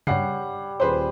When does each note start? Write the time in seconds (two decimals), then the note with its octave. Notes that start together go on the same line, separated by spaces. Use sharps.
0.07 G2 C#3 G3 C#5 F#5 C7
0.80 D#1 G#4 B4 C5 C6